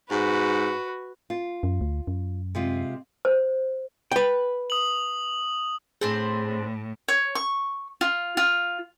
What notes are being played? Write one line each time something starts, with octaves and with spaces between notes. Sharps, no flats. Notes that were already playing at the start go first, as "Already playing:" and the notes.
G#2 F#4 B4
F4
F#2
D2
F#2
C3 G#3 F4
C5
B4 G5
D#6 F#7
A2 C4 D4 G#4 C5
C#5
C#6
F4
F4